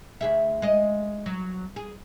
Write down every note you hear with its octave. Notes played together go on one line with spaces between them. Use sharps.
D2 G#4 E5
G#3 D#5
F#3
G#4